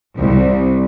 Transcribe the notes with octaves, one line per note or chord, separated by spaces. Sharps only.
C2